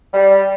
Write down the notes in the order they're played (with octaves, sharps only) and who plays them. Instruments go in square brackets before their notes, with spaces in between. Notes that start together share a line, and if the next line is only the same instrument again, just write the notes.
[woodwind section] G3